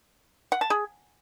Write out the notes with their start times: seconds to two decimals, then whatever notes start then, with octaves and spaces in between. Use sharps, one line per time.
0.52 F#5
0.61 A5
0.70 G#4